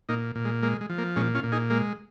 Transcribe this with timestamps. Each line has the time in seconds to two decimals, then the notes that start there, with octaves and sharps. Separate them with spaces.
0.09 A#2 A#3 D#4
0.35 A#2
0.45 G#3
0.63 G#3 A#3
0.81 G#3
0.90 F3
0.98 A#3
1.16 A#2 G#3 C#4
1.35 C#4 F4
1.43 A#2
1.52 D#4 G#4
1.70 G#3 A#3